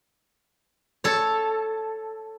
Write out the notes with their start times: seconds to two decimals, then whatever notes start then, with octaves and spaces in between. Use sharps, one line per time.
1.04 A4 C#5